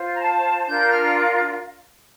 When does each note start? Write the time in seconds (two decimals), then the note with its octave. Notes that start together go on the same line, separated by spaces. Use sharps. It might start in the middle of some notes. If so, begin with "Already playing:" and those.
Already playing: F4 C5
0.14 A#5
0.20 A5
0.66 D4 F4 A#4 G6
0.89 F6